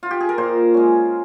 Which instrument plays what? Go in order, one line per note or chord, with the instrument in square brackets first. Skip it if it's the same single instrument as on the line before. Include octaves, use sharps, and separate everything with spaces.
[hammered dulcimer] F4
G4
G#4
A#4
A#2 C5
G#3 C#4